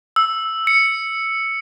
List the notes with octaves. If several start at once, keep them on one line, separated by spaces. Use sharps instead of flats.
E6
C#7